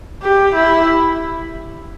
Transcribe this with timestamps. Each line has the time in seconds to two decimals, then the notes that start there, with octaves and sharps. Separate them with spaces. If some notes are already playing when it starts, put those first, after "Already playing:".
0.22 G4
0.55 E4